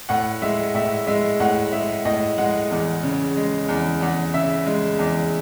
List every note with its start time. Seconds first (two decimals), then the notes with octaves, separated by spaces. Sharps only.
0.09 A2 F#5
0.42 G#3 E5
0.74 A2 E5
1.07 G#3 E5
1.40 A2 F#5
1.72 G#3 E5
2.05 A2 D#5
2.38 G#3 F#5
2.71 E2
3.03 C#3
3.37 G#3
3.69 E2
4.01 E2 F#5
4.34 C#3 E5
4.66 G#3
4.99 E2